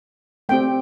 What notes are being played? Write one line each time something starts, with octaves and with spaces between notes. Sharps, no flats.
A3 C4 G4 G5